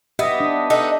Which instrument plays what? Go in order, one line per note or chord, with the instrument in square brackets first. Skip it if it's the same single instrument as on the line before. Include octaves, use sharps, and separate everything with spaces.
[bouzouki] B3 [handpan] G4 D#5 E5
[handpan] D4
[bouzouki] B3 D#4 A4